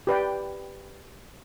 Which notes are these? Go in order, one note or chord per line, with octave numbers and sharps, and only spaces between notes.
G4 B4 D5 G5